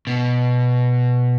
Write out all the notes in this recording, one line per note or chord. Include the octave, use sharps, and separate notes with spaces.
B2